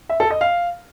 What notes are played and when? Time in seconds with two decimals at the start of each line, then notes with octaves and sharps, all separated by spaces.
0.09 E5
0.20 A4
0.30 D#5
0.41 F5